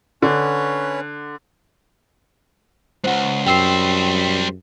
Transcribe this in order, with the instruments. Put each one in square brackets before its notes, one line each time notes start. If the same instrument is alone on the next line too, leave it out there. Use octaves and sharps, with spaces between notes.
[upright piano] D3 [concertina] C#4 B4 C#5
[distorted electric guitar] C#2 G#2 [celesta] C5 F#5
[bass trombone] F#2 [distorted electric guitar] G3 C5 [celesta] G5 E6 C7